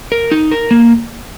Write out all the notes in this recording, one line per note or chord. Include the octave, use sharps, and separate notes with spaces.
A#4
D#4
A#4
A#3